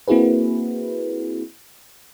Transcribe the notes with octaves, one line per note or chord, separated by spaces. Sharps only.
A#3 C4 E4 F#4 G#4 B4